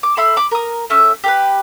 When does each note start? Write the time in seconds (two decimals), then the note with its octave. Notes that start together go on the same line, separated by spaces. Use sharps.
0.03 D6
0.17 A4 E5 B5 C6
0.37 B5 D6
0.51 A#4 D#6
0.90 A3 C#4 E5
1.24 G4 A#4 B4